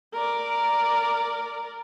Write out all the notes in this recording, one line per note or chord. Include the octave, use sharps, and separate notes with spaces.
A#4 D5